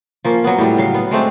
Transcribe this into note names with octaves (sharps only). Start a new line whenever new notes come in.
F3 A#3 C#4
F#3 B3
A2 G3
C#3 F#3 F5
B3
G#3 A3 C4 D4